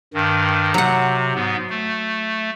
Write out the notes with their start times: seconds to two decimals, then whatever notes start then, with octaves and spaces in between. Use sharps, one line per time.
0.14 G2 D#3
0.74 C3 F#3 F#5
1.35 G#2 B3
1.70 A3